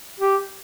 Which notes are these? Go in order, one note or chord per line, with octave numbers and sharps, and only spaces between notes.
G4